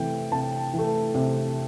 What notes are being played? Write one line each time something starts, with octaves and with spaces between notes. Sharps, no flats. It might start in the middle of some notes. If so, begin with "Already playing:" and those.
Already playing: C3 E3 A3 G5
C3 A5
E3
A3
C3